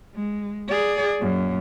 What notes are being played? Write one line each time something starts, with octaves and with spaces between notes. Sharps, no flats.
G#3
G#4 D5
F#2 A#2